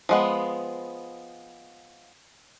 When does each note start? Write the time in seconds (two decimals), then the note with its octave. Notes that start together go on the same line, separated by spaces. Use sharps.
0.09 F3 G#3 B3